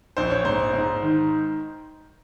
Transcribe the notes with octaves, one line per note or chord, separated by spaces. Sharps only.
A#1 C5
C#5
G#2 C5
G#2
D#3